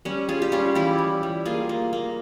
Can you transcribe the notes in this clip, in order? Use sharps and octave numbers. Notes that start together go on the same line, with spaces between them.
G3 C#4
G3 F4 G#4
G4
G3 C#4 F4
E3 E4 G4
G3
G3
A#3 F4 G#4
A#3
A#3